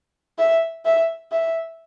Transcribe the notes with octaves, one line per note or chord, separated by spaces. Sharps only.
E5
E5
E5